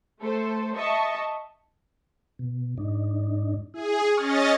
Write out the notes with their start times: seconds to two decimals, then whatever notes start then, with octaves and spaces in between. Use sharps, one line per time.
0.21 A3 A4 C5
0.76 D#5 E5 A5 C#6
2.39 B2
2.78 G#2 D4 D#4
3.74 E4 G#4
4.17 C#4 D#5 G#5 C#6 F6 A6